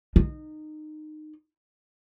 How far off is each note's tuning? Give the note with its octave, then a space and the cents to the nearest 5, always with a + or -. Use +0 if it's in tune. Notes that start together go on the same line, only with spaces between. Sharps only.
D#4 -20